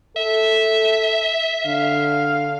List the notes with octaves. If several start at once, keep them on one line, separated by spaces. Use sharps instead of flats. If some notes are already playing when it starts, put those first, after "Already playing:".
A4 E5
D3 F5